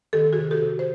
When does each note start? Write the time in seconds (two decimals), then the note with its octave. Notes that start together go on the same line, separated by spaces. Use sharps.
0.13 D#3 G4 A4
0.33 F#4 G#4
0.38 C3
0.51 G4 A4
0.63 C3
0.79 C5